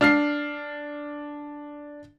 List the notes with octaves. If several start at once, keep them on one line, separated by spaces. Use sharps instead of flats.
D4 F6 C7